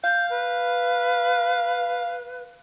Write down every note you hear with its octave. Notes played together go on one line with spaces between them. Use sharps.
F5 G6
B4